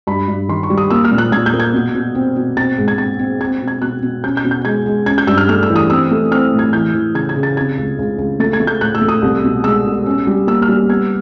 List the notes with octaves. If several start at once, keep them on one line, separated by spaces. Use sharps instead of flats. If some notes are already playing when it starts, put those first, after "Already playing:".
G2 B5
G2
D#3 C6
C#6
G3
D#6
A#3 E6
F6
A#2
F#6
A#2 G#6
G6
A#3
G#6
B2
B2
C4
B2
C4 A6
G#2
G#6
C4 A6
C4
C4 G#6
B2
G#6
B2 F#6
B2
C#4 G6
G6
B2
G6
G#3 G#6
G#3
C#4 G#6
G6
G2 E6
F6
A3 F6
E6
E3
D#6
C4 E6
A3
C4 F6
A2
G#6
E3 G6
E3
C#3 G#6
G#6
C#3
A6
C3 G#6
C#2
C#2
C#2
A3 A6
G#6
A3
G6
A2 F#6
E6
A3
D#6
C2
B2
G#3 E6
B2
C#4
G3
A#3 E6
F6
G3
B3 G#6